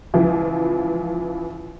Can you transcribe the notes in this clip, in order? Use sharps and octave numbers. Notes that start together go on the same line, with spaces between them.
C#2 E3 F3